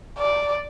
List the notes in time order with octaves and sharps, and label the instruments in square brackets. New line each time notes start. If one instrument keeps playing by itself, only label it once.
[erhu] D5